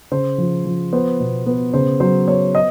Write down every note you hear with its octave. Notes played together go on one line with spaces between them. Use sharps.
C#3 C5
F3
F3
B3 C5
B2
B3
C#3 C5
F#3 C5
B3 C#5
D#5